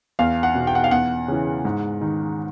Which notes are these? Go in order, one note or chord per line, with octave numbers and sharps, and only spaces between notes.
E2 F5
F#5
B2
G5
F#5
F5
E2 F#5
C#3 E3
G#2
D#3